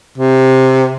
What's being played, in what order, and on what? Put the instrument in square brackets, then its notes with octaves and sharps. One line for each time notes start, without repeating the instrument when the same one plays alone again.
[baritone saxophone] C3